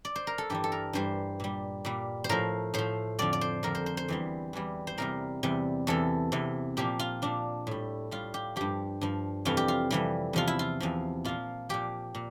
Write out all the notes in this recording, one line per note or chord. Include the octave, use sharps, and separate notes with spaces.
D5
C5
A#4
A4
G2 E3 G3 G4
A4
A#4
G2 E3 G3 C5
A#2 G3
A#2 G3
C5
A2 F3 A#4
A2 F3 C5
F2 D3 F3 D5
D5
C5
F2 D3 F3 A#4
C5
C5
C5
E2 E3 G3
E2 E3 G3
C5
E2 C3 G3 A#4
E2 C3 G3
E2 C3 E3 A4
E2 C3 E3
A#2 F3 G4
F4
A#2 F3 D4
A2 G3
A2 G3 F4
G4
G2 F3 G4
G2 F3
F2 C3 E3 G3 F4
G4
F4
F2 C3 E3 G3
E2 C3 F3 F4
E4
F4
E2 C3 F3
A#2 F3 F4
A#2 F3 G4
A#2